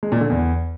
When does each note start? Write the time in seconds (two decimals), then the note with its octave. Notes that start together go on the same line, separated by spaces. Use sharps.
0.03 G#3
0.12 A#2
0.21 D3
0.30 E2